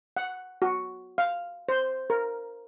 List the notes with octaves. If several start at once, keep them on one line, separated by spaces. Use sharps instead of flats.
F#5
F#4
F5
C5
A#4